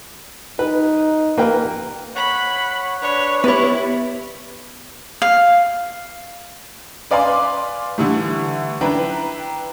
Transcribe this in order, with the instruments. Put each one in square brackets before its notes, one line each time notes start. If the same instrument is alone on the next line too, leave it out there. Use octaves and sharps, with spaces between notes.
[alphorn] D#4 [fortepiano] B4
[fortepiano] A#3 B4 G5
[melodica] C#5 F#5 [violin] B5
[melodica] D4 B4 [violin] C#5
[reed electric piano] B3 G4 [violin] E4 [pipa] B4 C#5 [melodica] D5
[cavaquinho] F5
[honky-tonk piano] B4 D5 F5 G#5 C6 D6
D3 E3 G3 A3
D4 E4 B4 G5 A#5